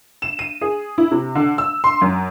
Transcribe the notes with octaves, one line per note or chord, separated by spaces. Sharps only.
E7
D#7
G#4
E4
C3
D3
E6
C6
F#2